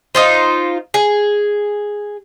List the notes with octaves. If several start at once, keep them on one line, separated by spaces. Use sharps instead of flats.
D#4 F4 C5
G#4